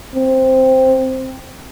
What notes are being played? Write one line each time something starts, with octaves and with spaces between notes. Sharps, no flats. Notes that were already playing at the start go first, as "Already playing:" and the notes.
C4